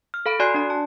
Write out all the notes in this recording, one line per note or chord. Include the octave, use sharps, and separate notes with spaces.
F6
A4 F5 B5 D7
F#4 D5 G#5 C6 F#6 C7
D4 D5
A5